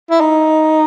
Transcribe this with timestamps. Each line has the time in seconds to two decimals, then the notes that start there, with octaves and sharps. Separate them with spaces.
0.11 E4
0.21 D#4